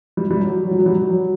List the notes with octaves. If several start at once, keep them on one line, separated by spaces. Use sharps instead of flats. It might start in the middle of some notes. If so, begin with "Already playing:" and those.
G3
G3
F#3
F#3
G3
F#3
G3
F#3
F#3